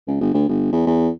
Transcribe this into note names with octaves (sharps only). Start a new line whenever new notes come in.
C#2
G1
D2
G1
E2
E2